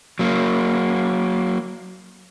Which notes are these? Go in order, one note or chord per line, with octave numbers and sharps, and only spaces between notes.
F#3 A#3